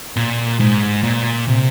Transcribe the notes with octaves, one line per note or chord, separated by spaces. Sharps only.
A#2
G#2
A#2
C3